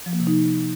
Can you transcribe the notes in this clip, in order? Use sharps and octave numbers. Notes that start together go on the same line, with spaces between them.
F3
A#3
C3
D#4